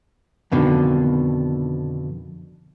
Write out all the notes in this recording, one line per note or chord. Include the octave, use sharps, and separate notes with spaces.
F2 B2 D3 D#3